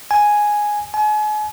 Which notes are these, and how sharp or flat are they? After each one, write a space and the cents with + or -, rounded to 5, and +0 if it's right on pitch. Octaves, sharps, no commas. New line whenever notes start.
G#5 +0
G#5 +35